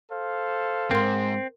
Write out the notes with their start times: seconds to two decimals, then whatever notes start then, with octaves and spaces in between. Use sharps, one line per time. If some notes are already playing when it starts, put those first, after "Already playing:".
0.11 A4 C5 F5
0.91 E2 G#2 C4 A#4 C6